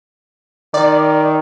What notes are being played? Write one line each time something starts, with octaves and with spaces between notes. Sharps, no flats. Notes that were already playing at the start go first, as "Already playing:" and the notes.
D#3 D5